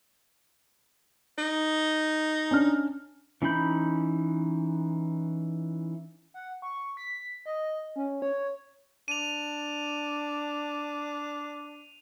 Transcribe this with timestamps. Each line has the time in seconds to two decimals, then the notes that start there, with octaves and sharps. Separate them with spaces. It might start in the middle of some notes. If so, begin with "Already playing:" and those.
1.38 D#4
2.51 C#4 D4 F6
3.42 E3 C#4 D#4 B5 G6
6.34 F#5
6.62 C#6
6.97 B6
7.46 D#5
7.96 C#4
8.22 C#5
9.08 D4 D#7 F7